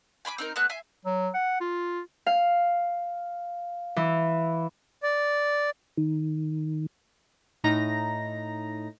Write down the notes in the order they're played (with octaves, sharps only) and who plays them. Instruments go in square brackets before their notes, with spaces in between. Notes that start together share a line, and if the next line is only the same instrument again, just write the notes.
[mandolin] G#5 B5 C6 D6
C4 D#4 A#4
A3 B3 F#4 F#6
E5 G#5 C6
[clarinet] F#3
F#5
F4
[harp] F5
E3
[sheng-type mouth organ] D5
[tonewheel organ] D#3
[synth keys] A2 D#4 A#5 A#6